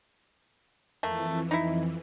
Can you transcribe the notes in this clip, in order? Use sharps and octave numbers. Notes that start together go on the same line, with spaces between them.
F2 E3 A3 A#3
D#4 E4